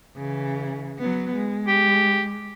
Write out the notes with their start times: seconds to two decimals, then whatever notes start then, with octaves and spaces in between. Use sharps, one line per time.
0.16 C#3 E3
0.98 F#3 B3
1.35 G#3
1.67 G4